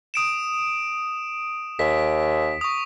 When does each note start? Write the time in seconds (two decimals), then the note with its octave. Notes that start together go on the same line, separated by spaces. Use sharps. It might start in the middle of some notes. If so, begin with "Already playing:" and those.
0.14 D#6 D7 E7
1.79 D#2 B6
2.61 C#6 D#6